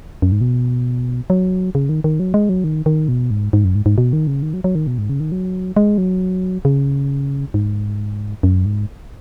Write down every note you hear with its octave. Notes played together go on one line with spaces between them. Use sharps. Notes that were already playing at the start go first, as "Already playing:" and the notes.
F#2
G#2
B2
F#3
C#3
D#3
D#3
F#3
G#3
F#3
D#3
D#3
B2
G#2
G#2
F#2
G#2
G#2
B2
D#3
C#3
D#3
F#3
F#3
D#3
B2
G#2
C#3
D#3
F#3
G#3
F#3
C#3
G#2
F#2
G#2